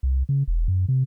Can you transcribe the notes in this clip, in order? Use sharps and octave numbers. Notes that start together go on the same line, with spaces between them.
C2
C#3
E1
F#2
C3